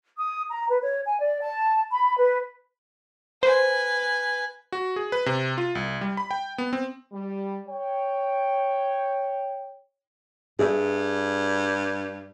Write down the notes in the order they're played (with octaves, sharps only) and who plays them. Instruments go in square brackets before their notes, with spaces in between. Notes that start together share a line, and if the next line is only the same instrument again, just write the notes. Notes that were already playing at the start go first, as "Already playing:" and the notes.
[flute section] D#6
A#5
B4
C#5
G#5
D5
A5
B5
B4
[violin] B4 G#5 [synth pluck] C5
[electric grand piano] F#4
G#4
B4
C3
F4
C2
G3
B5
G5
B3
C4
[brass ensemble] G3
C#5 G5
[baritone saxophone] G2 [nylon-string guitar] G#4 E5